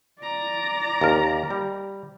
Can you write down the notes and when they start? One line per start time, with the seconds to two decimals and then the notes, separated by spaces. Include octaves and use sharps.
0.20 D5 A#5
1.01 D#2 A#4
1.50 G3